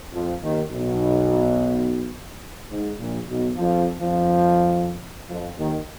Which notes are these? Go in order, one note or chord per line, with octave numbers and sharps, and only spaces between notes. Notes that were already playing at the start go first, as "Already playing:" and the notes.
F2 F3
D#2 D#3
B1 B2
G#2
A#1 A#2
B1 B2
F2 F3
F2 F3
F2 F3
D#2 D#3